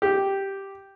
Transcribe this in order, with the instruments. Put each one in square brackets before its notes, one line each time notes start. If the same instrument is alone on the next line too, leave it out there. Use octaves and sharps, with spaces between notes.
[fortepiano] G4